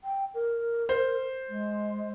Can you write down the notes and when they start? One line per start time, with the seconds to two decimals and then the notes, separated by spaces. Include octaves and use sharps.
0.03 G5
0.34 A#4
0.89 C5
1.49 G#3